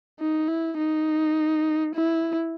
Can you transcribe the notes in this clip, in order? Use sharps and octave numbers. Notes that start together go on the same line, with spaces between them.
D#4
E4
D#4
E4